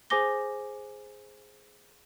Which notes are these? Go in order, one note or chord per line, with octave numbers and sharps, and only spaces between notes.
G#4 C5 G#5 D6 A#6 G7